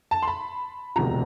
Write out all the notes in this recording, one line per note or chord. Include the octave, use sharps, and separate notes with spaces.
A5
C6
B5
E1 D2 C3 F3 A#5